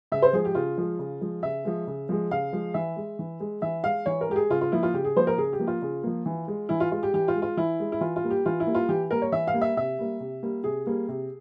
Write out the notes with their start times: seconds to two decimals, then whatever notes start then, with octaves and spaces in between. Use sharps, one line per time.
0.12 C#3 E5
0.22 C5
0.33 F3 G#3 G#4
0.45 G4
0.55 C#3 F4
0.78 F3 G#3
0.99 C#3
1.21 F3 G#3
1.43 C#3 E5
1.65 F3 G#3
1.87 C#3
2.09 F3 G#3
2.31 C#3 F5
2.53 F3 G#3
2.74 E3 E5
2.96 G#3
3.19 E3
3.40 G#3
3.62 E3 E5
3.84 G#3 F5
4.06 E3 C#5
4.21 A#4
4.29 G#3 G4
4.36 G#4
4.50 C#3 F4
4.61 F4
4.72 F3 A#3 E4
4.83 F4
4.94 C#3 G4
5.05 G#4
5.16 F3 A#3 C5
5.27 A#4
5.37 C#3 G#4
5.53 G4
5.59 F3 A#3
5.67 F4
5.82 C#3
6.03 F3 A#3
6.26 E3
6.48 G#3
6.69 E3 E4
6.80 F4
6.92 G#3 F4
7.03 G4
7.14 E3 G4
7.28 F4
7.35 G#3
7.42 F4
7.57 E3 E4
7.80 G#3
7.92 E4
8.01 E3 F4
8.16 F4
8.23 G3 A#3
8.30 G4
8.46 E3 F4
8.60 E4
8.67 G3 A#3
8.75 F4
8.89 E3 G4
9.11 G3 A#3 A#4
9.22 C#5
9.32 E3 E5
9.48 F5
9.54 G3 A#3
9.62 E5
9.77 C3 E5
9.98 G3 A#3
10.20 C3
10.43 G3 A#3
10.64 C3 G#4
10.87 G3 A#3
11.08 C3